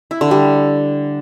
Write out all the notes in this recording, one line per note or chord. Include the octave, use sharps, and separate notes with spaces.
E4
D3
G3